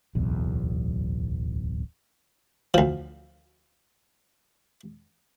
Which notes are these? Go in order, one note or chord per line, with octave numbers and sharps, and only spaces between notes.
D1 B1 E2
D2 F3